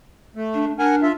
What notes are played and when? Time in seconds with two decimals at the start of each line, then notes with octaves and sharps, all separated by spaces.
0.36 A3
0.54 D4
0.79 D4 A#4 F#5 G#5
1.02 F4 E5